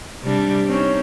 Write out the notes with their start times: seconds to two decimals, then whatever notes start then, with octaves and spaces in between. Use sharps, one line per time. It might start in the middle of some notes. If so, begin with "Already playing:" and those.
0.23 C3 G3 D4
0.67 C4 C#4 D#4